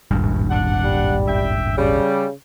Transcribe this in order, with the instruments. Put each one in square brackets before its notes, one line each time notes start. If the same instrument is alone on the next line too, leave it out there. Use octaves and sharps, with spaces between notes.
[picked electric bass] D#1 G#1 G2
[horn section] D4 F#5
[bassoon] G3
[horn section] E5 G5
[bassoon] C#3 [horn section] G3